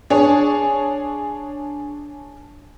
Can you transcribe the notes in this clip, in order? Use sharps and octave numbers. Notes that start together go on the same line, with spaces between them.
D4 G#4 C#5